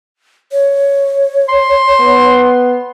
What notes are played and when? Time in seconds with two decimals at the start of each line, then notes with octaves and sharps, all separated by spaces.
0.52 C#5
1.49 C6
2.00 B3